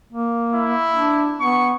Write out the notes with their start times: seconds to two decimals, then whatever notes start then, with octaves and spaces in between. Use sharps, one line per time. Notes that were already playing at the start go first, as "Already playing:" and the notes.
0.13 A#3
0.54 E4
0.96 D4
1.40 B3 C#6